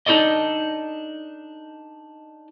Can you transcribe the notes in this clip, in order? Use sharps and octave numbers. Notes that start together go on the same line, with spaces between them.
D4 D#4 F4 A4 D5 D#5